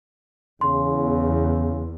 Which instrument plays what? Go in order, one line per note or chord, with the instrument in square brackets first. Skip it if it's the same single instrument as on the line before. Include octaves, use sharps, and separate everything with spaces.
[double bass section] E2 [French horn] C#3 [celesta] C6